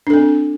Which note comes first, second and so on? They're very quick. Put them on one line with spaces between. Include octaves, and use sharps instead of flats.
D4 A4 C4